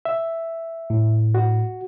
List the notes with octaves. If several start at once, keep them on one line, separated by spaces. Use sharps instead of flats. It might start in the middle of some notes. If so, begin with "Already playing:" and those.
E5
A2
F#4